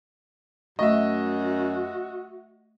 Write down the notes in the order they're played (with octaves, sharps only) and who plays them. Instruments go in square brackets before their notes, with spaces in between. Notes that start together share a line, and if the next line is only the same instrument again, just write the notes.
[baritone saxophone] F#2 [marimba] A3 C#6 [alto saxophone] F#4 [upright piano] D#5 E5